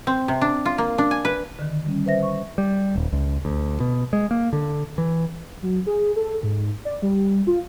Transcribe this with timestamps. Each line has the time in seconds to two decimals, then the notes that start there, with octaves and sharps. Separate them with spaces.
0.07 C4
0.28 C3
0.41 D4
0.66 F4
0.78 A#3
0.98 D4
1.11 G#5
1.25 B4
1.59 D3 D#3
1.86 G3 C#4
2.06 B4 C5 E5 A#6
2.23 C#6
2.58 G3
2.96 D#1
3.13 C#2
3.45 D2
3.80 B2
4.13 G#3
4.31 A#3
4.53 D3
4.98 E3
5.62 F#3
5.87 G#4
6.16 A4
6.43 G#2
6.85 D5
7.02 G3
7.47 F4